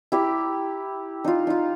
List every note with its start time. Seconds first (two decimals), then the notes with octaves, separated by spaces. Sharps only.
0.12 E4 G4 A#5
1.24 D#4 F4
1.47 D#4 F4